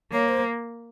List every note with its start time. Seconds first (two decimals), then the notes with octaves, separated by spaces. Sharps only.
0.13 A#3 C#5
0.28 C5